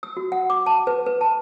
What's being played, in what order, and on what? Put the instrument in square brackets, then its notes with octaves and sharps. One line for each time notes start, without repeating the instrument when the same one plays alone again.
[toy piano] E6
F#4
F#5
D6
A5
B4
B4
A5